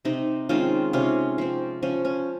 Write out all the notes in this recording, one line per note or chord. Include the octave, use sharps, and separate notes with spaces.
C3 C4 D#4
D#3 G#3 C4 C#4 F4
C3 C#4 F4
F3 C4
F3 C#4
C#4